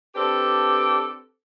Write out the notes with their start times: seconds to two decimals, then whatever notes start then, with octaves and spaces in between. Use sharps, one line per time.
0.15 C4 D4 G4 A4 B4